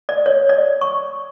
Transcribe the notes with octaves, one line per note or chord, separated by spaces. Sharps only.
D5
C#5
D5
C#6